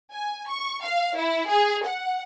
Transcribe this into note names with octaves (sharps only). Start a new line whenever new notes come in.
G#5
C#6
F5
E4
G#4
F#5